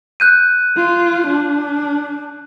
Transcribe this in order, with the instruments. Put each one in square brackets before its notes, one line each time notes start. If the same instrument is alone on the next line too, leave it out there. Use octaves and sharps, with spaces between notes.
[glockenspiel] F#6 G6 D#7
[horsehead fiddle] F4
D4